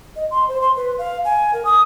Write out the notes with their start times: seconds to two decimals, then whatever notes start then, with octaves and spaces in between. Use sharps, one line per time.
0.16 D#5
0.31 C6
0.48 C5
0.61 C6
0.76 B4
0.98 F5
1.24 G#5
1.53 A#4
1.65 D#6